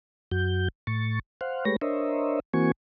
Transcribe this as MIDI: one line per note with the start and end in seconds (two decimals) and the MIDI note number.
0.31 0.68 42
0.31 0.68 66
0.31 0.68 91
0.87 1.19 45
0.87 1.19 85
0.87 1.19 93
1.41 1.65 72
1.41 1.65 77
1.41 1.65 78
1.65 1.76 56
1.65 1.76 57
1.65 1.76 67
1.65 1.76 71
1.65 1.76 73
1.65 1.76 94
1.81 2.40 62
1.81 2.40 70
1.81 2.40 72
1.81 2.40 73
1.81 2.40 75
1.81 2.40 76
2.54 2.72 52
2.54 2.72 58
2.54 2.72 60
2.54 2.72 66
2.54 2.72 80
2.54 2.72 85